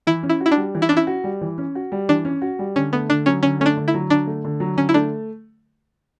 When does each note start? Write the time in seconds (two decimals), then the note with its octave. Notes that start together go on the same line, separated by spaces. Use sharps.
0.07 E3 E4
0.23 C#4
0.29 E4
0.41 F#4
0.46 E4
0.52 D4
0.57 G3
0.75 E3
0.82 E4
0.89 C#4 D4
0.97 E4
1.07 F#4
1.24 G3
1.41 E3
1.58 C#4
1.75 F#4
1.92 G3
2.09 E3 D4
2.25 C#4
2.42 F#4
2.59 G3
2.76 D3 C#4
2.93 A3 B3
3.09 D3 D4
3.26 F#3 C#4
3.43 D3 C#4
3.60 A3 C#4
3.66 D4
3.77 D3
3.88 E4
3.94 F#3
4.10 D3 D4
4.27 A3
4.45 D3
4.60 F#3
4.77 D3 C#4
4.89 E4
4.94 A3 D4